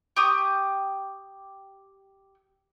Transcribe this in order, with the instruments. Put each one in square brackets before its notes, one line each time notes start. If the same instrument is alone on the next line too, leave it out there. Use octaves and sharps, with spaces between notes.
[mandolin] G4 C#6 D#6